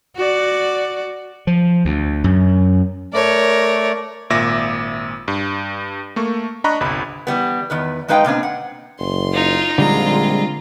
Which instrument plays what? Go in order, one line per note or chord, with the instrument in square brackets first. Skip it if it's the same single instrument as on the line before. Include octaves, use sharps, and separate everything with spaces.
[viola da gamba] F#4 D5
[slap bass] F3
D2
F#2
[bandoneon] A3 D5 [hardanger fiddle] A#4 C#5
[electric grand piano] G#1 A#2 E5 D6 A#6
G2
A3 A#3 C#6
D4 D#5 A#5 B5 C#6 F#6
G1 C2 B5
[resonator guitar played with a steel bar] E3 G3 B3
E2 D#3 B4
G#2 G#3 D#4 B4 F5 G5
B2 A#3 C4 D4
F#5
[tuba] F#1 [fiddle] C6
[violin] D#4 F4
[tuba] A#1 [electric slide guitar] D3 G3 G#3 [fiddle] C4 A#5 [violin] F4